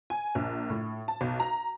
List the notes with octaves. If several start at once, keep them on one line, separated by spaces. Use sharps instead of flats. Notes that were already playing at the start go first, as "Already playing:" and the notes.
G#5
A#1
A2
A5
B1
A#5